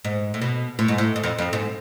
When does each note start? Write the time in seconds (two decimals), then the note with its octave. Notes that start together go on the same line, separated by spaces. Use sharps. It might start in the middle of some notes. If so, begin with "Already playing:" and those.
0.05 G#2
0.34 A2
0.42 B2
0.79 A2
0.88 G#2
0.98 A2
1.16 G#2
1.23 F2
1.38 F2
1.53 G#2